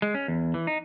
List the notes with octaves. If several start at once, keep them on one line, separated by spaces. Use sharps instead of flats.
G#3
C#4
E2
E3
D#4